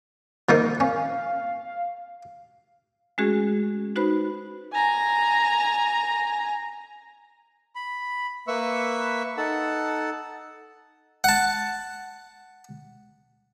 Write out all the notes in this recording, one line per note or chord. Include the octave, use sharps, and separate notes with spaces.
F3 A#3 D#4
C#4 F5
G#3 A3 C#4 F#4 G#4
D#4 F#4 B4 C5 B5
G#5 A#5
B5
A#3 B4 E5 C#6 E6
D#4 A4 F#5 A5
F#5 A5